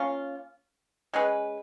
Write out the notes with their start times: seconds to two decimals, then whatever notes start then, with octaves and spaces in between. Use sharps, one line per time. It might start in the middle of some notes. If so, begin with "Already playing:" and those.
Already playing: A#3 C#4 F4
1.14 G#3 C#4 G#4 B4